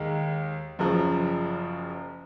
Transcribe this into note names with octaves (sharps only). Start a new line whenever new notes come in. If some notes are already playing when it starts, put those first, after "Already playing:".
Already playing: D#2 D#3 G#3
F#1 F#2 C#3 F3